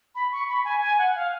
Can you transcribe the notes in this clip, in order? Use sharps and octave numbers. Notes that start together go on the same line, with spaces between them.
B5
C#6
B5
G#5
G#5
F#5
F5